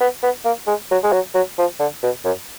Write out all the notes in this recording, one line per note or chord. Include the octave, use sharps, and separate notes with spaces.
B3
B3
A#3
G#3
F#3
G#3
F#3
F#3
F3
D3
B2
F#2